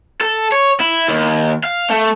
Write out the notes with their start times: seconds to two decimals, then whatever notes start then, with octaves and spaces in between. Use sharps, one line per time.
0.21 A4
0.52 C#5
0.80 E4
1.09 D#2
1.64 F5
1.90 A3